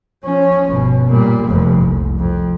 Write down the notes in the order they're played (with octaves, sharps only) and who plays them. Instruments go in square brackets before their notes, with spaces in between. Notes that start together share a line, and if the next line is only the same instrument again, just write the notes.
[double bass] F3 C#4
G1 B2
A#2 G3
F1 F2
C2
F2